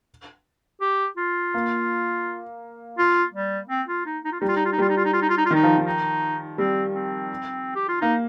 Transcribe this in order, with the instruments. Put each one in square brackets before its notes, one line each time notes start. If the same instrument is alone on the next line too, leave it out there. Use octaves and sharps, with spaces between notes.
[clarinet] G4
F4
[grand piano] A#3
[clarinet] F4
G3
C4
F4
D#4
D#4
F4
[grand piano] G3 [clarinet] D#4
[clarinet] F4
D#4
F4
D#4
[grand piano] G3 [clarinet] F4
[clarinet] D#4
F4
D#4
F4
D#4
F4
D#4
F4
[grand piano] D#3 [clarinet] D#4
[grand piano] F3
D#3
[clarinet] D#4
[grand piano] G3 [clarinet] C4
[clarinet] C4
G4
F4
[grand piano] A#3 [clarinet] D#4